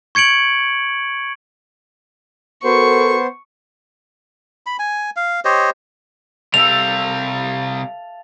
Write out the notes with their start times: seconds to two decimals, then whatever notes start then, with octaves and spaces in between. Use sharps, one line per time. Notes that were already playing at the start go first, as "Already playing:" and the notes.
0.15 C#6 G#6 C#7 D7 F#7
2.64 B3 F#4 A4 A#4 C5 C#6
4.66 B5
4.79 G#5
5.16 F5
5.45 G4 C5 C#5 D#5
6.54 C3 G3 A4 E5 F5 F7